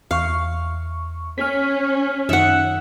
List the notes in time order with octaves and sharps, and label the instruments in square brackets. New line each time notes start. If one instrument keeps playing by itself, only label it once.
[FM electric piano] E2 C#6 [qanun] F5
[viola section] C#4 [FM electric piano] F6 B6
[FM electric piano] F#2 D#3 C#7 [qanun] E5 F#5